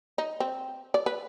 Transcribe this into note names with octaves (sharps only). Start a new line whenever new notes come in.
D#4
C4
D5
B4